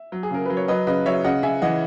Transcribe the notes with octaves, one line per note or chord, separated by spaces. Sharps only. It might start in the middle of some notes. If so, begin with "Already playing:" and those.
Already playing: E5
F#3
G#4
C#3 A#4
F#3 B4
C#5
F#3 B4 D#5
C#3 B4 D#5
F#3 C#5 E5
C#3 D#5 F#5
C#3 E5 G#5
E3 D#5 F#5